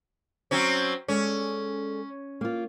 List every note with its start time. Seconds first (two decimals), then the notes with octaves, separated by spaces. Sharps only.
0.51 F#3 C4 C#4
1.08 G#3 C#4 A4 D5
2.41 A#3 F4